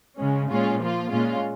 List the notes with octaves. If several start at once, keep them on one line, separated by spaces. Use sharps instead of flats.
C#3 G#3 C#4
A#2 G#3 C#4 F4
F3 A#3 F4
A#2 G#3 C#4 F4